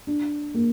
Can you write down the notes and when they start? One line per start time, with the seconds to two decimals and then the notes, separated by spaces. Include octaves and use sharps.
0.07 D4
0.54 A#3